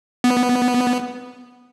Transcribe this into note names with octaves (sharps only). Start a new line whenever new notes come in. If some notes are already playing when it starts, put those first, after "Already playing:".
B3